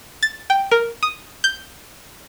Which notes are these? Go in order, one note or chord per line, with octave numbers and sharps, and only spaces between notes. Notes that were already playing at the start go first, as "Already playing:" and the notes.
A6
G5
A#4
D#6
G6